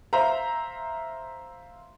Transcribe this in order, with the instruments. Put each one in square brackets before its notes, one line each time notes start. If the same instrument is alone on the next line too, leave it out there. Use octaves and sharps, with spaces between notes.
[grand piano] C5 E5 F5 A#5